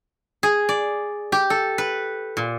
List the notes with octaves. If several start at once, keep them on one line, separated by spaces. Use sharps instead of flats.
G#4
D5
G4
A4
B4
A#2